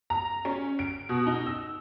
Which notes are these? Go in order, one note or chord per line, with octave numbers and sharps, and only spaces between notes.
A#5
C#4
D7
B2
D#4
E6